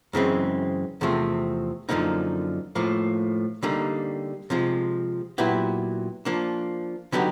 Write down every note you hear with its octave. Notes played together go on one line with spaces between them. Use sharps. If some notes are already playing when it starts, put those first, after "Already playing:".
F#2 C#3 E3 G#3 C4
E2 C3 F3 A3 C4
F#2 D3 F3 A#3 D#4
A2 F3 A#3
D3 G3 A#3 D#4
C3 F3 G#3
A#2 F#3 B3 E4 G4
F3 A#3 D4
D3 F#3 B3 D#4 G4